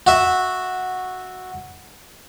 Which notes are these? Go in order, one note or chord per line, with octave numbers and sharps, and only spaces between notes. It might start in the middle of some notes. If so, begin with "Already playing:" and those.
F#4 E5